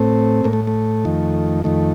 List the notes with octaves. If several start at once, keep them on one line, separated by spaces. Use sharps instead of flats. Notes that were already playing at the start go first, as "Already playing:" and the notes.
Already playing: A2 A3 C4
A2 A#3
A3
A3
F2 D#3
F2 D#3 A3